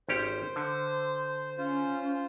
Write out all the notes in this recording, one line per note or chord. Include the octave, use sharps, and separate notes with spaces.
G#1 C#4 G4 C5
D3
C#4 F4 C5